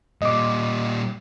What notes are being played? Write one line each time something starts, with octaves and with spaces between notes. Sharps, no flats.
A#2 G3 D#5 D6